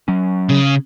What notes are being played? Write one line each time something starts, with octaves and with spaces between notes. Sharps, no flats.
F#3 C#4
C#3